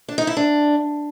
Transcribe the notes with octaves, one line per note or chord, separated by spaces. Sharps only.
D4
D#4
E4
D4